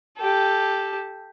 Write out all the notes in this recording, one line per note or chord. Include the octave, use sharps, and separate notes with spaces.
G4 A4